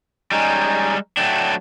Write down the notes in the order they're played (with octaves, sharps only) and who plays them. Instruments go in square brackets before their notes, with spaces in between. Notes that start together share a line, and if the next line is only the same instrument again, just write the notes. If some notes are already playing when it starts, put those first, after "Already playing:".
[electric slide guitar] G3 G#3 [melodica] C#4 D#4
[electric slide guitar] F#3 A3 D4 [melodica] G5